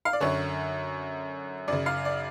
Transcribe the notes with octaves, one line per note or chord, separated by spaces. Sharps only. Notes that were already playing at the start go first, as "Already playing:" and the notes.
F5
D5
F#2 D3 C#5
F#2 C#3 D5
F5
D5